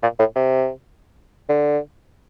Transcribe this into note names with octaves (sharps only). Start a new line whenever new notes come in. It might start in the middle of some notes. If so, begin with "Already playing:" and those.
A#2
A2
C3
D3